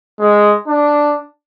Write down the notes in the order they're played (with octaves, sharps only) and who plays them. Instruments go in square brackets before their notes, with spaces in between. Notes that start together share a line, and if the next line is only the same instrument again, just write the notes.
[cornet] G#3
D4